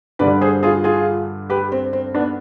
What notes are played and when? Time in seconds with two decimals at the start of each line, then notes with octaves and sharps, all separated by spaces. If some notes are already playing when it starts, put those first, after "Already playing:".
0.19 G2 D3 G3 B4 D5
0.41 G#4 C5
0.63 F4 G#4
0.84 F4 G#4
1.50 G4 B4
1.72 C4
1.93 C4
2.15 B3 D4